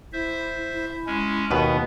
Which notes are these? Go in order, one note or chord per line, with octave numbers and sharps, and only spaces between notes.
E4 C5 E5
E4
G#3 C#4
D#2 B2 B3 B4